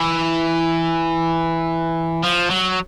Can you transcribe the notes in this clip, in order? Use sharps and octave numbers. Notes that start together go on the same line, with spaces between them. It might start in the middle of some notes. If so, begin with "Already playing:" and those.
Already playing: E3
F3
F#3